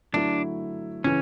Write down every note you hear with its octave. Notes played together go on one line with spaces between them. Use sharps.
D3 F#3 A3 D4 E4
C#3 E3 C#4